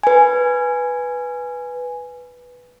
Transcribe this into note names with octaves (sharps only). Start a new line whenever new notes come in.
B4 G#5